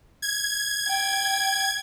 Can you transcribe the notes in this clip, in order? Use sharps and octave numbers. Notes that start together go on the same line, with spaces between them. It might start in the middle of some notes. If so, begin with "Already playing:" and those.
G#6
G5